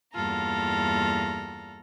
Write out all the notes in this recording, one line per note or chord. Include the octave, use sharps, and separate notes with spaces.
E2 G2 A#3 F4 A4 A#5